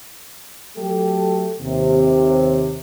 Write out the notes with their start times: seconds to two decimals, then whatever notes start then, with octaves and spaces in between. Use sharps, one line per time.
0.77 F#3 A3 G4 A4
1.60 D#2 C3